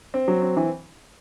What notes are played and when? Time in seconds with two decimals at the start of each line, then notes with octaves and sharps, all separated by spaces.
0.14 C4
0.28 F#3
0.42 C4
0.57 E3